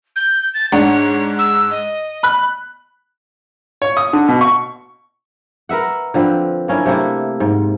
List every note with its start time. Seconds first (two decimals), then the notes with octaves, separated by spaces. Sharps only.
0.16 G6
0.54 A6
0.72 G#2 D4 C#5 F#5
1.38 E6
1.71 D#5
2.23 B5 F#6
3.82 C#5
3.97 D#6
4.13 D3
4.28 B2
4.41 C#6
5.69 A#4 B4 E5 F#5
6.14 D3 F3 C4 B4
6.68 A#3 C#4 D4 E4
6.85 C3 A3 A#3 E4
7.40 G#2